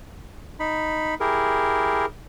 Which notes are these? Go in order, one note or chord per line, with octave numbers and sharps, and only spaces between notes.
D#4 B5
E4 G4 G#4 A#4